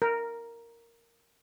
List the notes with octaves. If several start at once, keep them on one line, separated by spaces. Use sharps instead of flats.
A#4